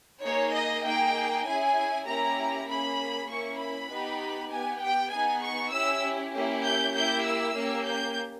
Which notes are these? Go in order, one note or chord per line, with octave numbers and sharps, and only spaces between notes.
A#3 D#4 G#4 C#5
D#5
A#3 D#4 G#4 G5
C#4 E4 G#4 G#5
A#3 C#4 E4 G4 A#5
A#3 C#4 G#4 B5
A#3 C#4 E4 C#6
B5
B3 D#4 G4
B3 G4 G#5
G5
B3 D#4 G#4 G#5
C#6
C#4 E4 G4 E6
A#3 C#4 E4 G4
G6
A#3 E4 G4 G6
E6
A#3 C#4 G4
G6